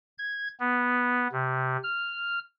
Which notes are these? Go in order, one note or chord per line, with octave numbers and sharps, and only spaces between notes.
G#6
B3
C3
F6